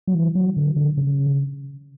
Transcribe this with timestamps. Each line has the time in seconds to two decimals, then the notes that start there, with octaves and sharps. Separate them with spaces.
0.07 F#3
0.15 E3
0.35 F#3
0.57 D3
0.76 D3
0.97 C#3